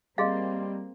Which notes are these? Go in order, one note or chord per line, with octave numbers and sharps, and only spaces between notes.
G3 A#3 C4 G#4 D#5 F5 C6 A6